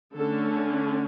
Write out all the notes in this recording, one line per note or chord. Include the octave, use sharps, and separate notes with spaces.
D3 A3 C#4 A4